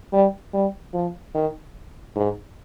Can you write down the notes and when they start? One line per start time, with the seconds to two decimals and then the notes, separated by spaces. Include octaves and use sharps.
0.13 G3
0.53 G3
0.94 F3
1.35 D#3
2.16 G#2